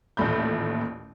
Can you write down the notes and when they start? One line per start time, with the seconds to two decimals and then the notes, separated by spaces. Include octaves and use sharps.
0.17 A1 D#2 A#2 A3 B5 G6